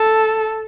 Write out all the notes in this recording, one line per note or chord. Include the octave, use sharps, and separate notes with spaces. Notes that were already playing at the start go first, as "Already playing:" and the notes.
Already playing: A4